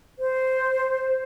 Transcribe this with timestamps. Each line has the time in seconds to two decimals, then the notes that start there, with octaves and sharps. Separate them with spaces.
0.19 C5